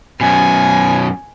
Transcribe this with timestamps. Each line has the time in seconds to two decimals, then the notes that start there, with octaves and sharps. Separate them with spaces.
0.21 F#2 B2 G#5